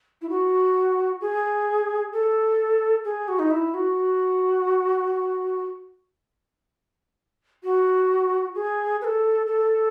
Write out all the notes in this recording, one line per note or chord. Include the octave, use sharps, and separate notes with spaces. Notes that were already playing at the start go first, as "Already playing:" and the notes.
E4
F#4
G#4
A4
G#4
F#4
D#4
E4
F#4
F#4
G#4
B4
A4
A4